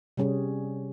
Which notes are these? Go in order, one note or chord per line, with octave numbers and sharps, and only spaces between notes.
C3 G3 C#4 G#4